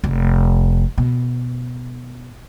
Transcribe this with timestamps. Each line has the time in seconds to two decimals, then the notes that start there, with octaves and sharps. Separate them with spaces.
0.04 F1
0.98 B2